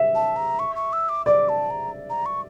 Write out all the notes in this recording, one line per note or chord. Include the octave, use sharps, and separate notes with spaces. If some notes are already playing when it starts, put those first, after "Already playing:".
Already playing: E5
A5
A#5
C#6
C#6
E6
D6
D5 D6
A5
A#5
A#5
C#6